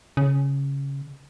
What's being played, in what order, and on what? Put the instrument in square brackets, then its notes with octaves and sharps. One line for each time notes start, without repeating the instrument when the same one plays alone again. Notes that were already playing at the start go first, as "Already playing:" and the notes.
[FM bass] C#3